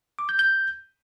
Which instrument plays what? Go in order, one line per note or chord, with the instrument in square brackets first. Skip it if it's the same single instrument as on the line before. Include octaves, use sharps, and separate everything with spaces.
[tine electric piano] D6
G6
G6